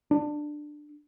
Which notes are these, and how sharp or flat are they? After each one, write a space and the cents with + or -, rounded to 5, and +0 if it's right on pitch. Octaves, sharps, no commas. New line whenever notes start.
D4 +15